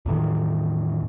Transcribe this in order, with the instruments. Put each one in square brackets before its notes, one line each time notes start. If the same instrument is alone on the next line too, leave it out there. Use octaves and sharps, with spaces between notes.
[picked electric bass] E2 A2 D#3